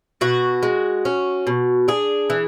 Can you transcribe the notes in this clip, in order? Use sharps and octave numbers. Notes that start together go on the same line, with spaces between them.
B2 F#4
G#3
C#4
B2
D4 G#4
E3